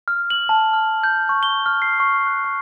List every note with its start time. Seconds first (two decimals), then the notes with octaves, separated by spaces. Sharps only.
0.08 F6
0.30 F#7
0.49 A5
0.73 F6
1.03 G6
1.29 C#6
1.43 G7
1.66 F6
1.82 C7
2.00 C#6
2.27 F#6
2.44 C#6